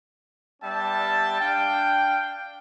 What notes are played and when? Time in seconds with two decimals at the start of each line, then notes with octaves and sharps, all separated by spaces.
0.62 G3 B3 D4 E5 G5 A5
1.40 D4 F5 G5